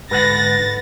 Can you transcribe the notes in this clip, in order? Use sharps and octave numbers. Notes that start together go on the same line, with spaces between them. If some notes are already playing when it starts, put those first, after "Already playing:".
G#2 D3 B4 F#5 A6 A#6